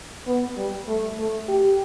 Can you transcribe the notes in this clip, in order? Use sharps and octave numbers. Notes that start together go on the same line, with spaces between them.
B3
G3
A3
A3
G4